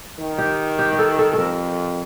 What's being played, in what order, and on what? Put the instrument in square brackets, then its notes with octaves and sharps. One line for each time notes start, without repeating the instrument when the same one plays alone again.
[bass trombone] D#3
[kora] G4
G4
G4
A4
A4
[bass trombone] F2 [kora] A4 A#4